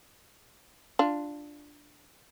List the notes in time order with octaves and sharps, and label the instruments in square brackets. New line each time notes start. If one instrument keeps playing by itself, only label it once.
[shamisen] D4 F4